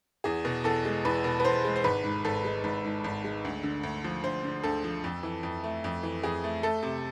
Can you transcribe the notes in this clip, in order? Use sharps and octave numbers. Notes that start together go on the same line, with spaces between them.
E2 G#4
B2
E2 A4
G#3
E2 B4
B2
B4
E2 C5
G#3
C5
G#1 B4
G#2
G#1 A4
G#3
G#1
G#2
G#1
G#3
D2
D3
D2
F3
D2 C5
D3
D2 A4
F3
F2
E3
F2
A3
F2
E3
F2 G#4
A3
A3 A4
C3